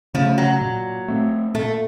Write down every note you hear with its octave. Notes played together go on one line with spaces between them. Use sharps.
C#3 F3 A3 C#4
F#3
A#2
A3 C4
A#2 A3